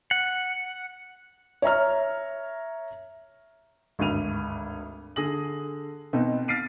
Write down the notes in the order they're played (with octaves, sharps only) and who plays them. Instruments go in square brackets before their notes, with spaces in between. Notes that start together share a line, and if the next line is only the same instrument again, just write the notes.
[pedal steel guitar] F#5
[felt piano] C#5 E5 A#5 F6
[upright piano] G#1 D2 G2 D#7 F7
D3 G#4 D#6 A#6 F#7
B2 B3 C4 D#4
F6 A6 B6 C7 D7 D#7